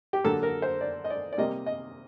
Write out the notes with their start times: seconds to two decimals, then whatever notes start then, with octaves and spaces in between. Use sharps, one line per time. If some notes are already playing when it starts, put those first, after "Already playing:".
0.13 G4
0.24 D3 F#3 A#3 A4
0.43 A#4
0.62 C5
0.81 D5
1.04 D#5
1.10 D5
1.33 D5
1.38 C3 G3 A#3 D#5
1.66 D#5